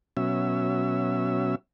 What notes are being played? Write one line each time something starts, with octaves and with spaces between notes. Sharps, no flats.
B2 F#3 C#4 E5